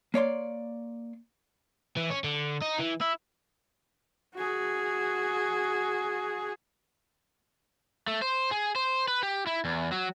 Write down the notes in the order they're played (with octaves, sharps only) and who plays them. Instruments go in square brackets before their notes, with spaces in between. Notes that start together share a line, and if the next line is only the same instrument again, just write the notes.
[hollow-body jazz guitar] A#3 C#5 D5 C6
[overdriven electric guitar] E3
C#4
D3
D#4
E3
E4
[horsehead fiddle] F#4 G#4
[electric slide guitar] A3
C5
G#4
C5
B4
G4
E4
E2
F#3